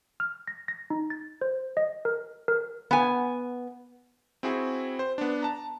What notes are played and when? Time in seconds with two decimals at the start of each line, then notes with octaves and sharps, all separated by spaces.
0.20 F6
0.48 A#6
0.68 A#6
0.90 D#4
1.10 A6
1.41 C5
1.77 D#5
2.05 A#4
2.48 A#4
2.91 B3 G#5
4.43 C4 E4 F#4 G#4
4.99 C5
5.18 B3 D4
5.42 A5 A#5